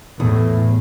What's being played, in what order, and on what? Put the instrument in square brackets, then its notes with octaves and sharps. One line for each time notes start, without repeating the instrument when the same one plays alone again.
[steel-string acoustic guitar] E2 [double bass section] A2